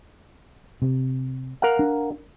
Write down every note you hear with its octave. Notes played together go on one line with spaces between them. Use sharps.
C3
A#4 F5 F#5
D4